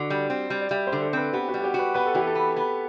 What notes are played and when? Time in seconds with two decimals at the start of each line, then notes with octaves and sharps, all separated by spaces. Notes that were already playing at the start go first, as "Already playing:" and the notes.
Already playing: D3 F#4
0.10 G3
0.30 C4
0.50 G3
0.61 D5
0.71 G3 E5
0.87 C5
0.92 D3
1.02 A4
1.13 C4 B4
1.33 B3 G4
1.48 F#4
1.54 G3
1.60 F#4
1.64 G4
1.74 F#4 B4
1.94 B3 B4
2.06 A4
2.15 E3 G4
2.27 A4
2.35 B3
2.56 B3